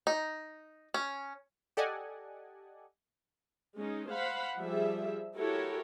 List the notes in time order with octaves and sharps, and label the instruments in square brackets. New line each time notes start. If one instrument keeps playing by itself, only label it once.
[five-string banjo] D#4
C#4
[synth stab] G4 A4 D5 D#5 F#5 G#5
[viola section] G#3 C#4 D#4
C5 F5 F#5 B5
F3 G3 G#4 E5
E4 F#4 G4 A4 A#4 C#5